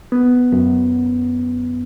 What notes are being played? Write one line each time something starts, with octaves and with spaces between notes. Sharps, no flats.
B3
F#2